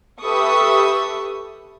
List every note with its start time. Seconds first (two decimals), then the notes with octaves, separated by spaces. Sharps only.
0.21 G4 A4 B4 E5 C#6 D#6